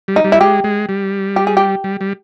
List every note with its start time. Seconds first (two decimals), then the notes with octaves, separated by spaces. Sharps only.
0.08 G3
0.16 D#4
0.24 G3
0.32 E4
0.41 G#3 G4
0.64 G#3
0.89 G3
1.36 G4
1.47 G#4
1.57 G4
1.84 G3
2.01 G3